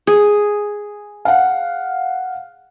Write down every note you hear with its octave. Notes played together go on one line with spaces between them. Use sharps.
G#4
F5 F#5